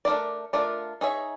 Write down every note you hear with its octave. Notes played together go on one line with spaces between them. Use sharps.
A3 D4 F4 A#4 D5
A3 D4 F4 A#4 D5
D#4 G#4 C#5 E5